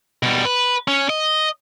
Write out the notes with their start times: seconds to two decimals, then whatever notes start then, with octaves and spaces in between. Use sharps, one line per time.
0.23 B2 G3
0.45 B4
0.88 C#4
1.10 D#5